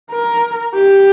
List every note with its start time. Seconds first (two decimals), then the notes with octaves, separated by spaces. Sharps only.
0.11 A#4
0.74 G4